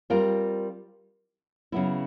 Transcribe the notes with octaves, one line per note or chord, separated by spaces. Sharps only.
G3 C4 F4 A#4
C#3 F#3 B3 E4